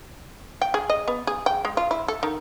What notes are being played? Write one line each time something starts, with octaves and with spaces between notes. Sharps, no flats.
G5
G#4
D#5
B3
G#4
G5
G#3
F4
E4
A4
D#3